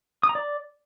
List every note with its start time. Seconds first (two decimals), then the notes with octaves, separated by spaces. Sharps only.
0.23 D#6
0.29 A#5
0.35 D5